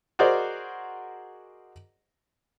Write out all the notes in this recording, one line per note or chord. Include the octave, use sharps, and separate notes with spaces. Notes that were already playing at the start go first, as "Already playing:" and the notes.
F#4 G#4 A#4 C5 D5 D#5